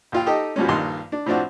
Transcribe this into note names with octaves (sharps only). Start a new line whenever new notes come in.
A#1 F4 G5
D#4 G4 A4 D#5 G5
F#2 B2 F3 G3 G#3 C#4
A#1 G2 D#3 C6
D4
A2 F3 C4 D4 F#4